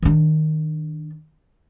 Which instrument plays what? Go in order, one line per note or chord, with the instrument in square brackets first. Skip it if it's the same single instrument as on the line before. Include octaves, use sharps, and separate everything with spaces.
[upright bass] D#3 D4